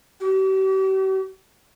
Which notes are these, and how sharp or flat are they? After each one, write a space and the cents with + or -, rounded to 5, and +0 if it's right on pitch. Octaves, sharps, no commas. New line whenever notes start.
G4 -45